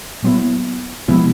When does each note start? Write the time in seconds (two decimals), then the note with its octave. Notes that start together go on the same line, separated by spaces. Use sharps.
0.22 A#2 F#3 B3 E4
1.08 C3 F3 G#3 B3 E4